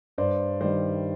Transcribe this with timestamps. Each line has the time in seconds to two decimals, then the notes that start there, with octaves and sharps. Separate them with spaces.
0.18 G2 C5 D5
0.61 D#3 G3 C5 D5